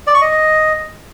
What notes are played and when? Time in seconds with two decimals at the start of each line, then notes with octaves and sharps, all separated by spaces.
0.07 D5
0.14 C#6
0.21 D#5